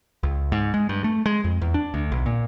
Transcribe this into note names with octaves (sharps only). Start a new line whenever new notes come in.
C#2
G#2
G#3
G2
A3
G#3
F2
E2
D4
D2
B1
A#2